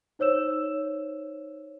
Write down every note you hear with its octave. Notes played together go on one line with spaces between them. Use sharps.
D#4 C5 C#5 E6 E7